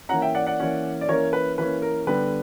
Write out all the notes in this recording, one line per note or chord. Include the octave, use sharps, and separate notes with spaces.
E3 A#3 C#4 F#5 A#5
E5 G5
D5 F#5
D5 F#5
E3 A#3 C#4
D5
E3 A#3 C#4 A#4 C#5
B4
E3 A#3 C#4 B4
A#4
D3 G3 B3 B4